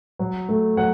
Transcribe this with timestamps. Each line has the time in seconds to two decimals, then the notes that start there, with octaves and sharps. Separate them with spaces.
0.19 F#3
0.49 A3
0.77 F#3 F#5